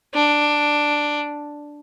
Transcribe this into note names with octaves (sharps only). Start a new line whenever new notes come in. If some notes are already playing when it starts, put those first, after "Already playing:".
D4